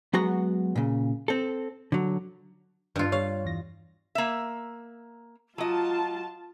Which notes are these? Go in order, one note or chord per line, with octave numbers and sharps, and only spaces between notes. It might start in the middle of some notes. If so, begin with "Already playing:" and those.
F#3 G#3 B3 F#4 A#5
A#2 C#3
C4 A4
D3 F#3
G2 F4
G3 C#5 F5
E2 E3 A#6
A#3 E5
F#3 F4 D#5 A5